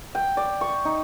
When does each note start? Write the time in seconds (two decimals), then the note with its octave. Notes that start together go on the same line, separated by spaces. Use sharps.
0.15 G5
0.37 D5
0.61 C#6
0.85 D#4